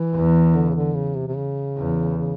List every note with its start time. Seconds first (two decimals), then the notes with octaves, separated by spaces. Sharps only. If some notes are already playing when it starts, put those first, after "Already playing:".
Already playing: E3
0.14 E2
0.55 D3
0.68 C#3
0.75 D3
0.95 C#3
1.16 C3
1.28 C3
1.36 C#3
1.77 E2
2.18 C#3